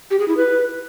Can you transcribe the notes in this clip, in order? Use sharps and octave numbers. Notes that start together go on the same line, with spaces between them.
G4
G#4
E4
B4